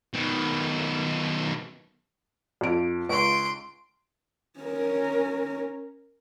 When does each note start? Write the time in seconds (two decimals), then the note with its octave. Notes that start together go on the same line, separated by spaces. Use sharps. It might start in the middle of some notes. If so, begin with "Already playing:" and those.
0.13 B2 D#3
2.61 F2 D7
3.09 C#2 C6 C#6 D7
4.60 C#4 A#4